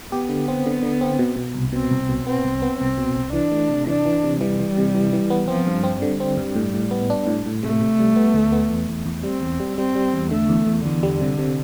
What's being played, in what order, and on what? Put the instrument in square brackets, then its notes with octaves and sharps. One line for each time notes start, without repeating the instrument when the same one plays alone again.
[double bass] B3 [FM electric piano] G4
[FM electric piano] D3
C4
D3
D3
C4
B2
B2
C2
[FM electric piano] B2 [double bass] C4
[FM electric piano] C2
B2
[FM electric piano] B3 [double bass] C4
[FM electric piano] C2
B3
[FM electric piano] C2 [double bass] C4
[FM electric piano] B2
C2
[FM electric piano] E3 [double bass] D4
[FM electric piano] A3
C3
[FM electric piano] E3 [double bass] D4
[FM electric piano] E3
C3
[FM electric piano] E3 [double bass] G3
[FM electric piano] E3
C3
E3
E3
B3
[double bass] F3 [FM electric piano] C4
[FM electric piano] G2
C4
[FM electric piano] D3 [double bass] G3
[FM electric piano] C4
G2
A2
A2
B3
D4
A2
A2
[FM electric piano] C3 [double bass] A3
[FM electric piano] C3
G3
B3
D2
B3
E2
E2
E2
[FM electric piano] G3 [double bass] C4
[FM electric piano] E2
G3
[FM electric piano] G3 [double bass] C4
[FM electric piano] G3
E2
[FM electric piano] D3 [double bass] A3
[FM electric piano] E2
E2
[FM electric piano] E2 [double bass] D3
[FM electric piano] G3
C3
C3